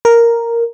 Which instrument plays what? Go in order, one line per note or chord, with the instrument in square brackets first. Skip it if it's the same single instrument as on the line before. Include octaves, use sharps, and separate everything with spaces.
[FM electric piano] A#4